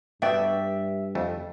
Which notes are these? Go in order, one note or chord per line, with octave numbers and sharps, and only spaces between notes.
G2 A3 B3 D4 F#4 D5 E5 G5
F2 A3